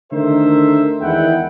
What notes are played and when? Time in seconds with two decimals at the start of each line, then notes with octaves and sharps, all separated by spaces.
0.12 D3 D#3 A3 A#4 C5 E5
1.02 E2 D#3 G#3 E4 F#5 G5